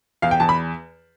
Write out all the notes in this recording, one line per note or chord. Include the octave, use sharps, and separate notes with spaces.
E2 F5
G5
E2 A5
B5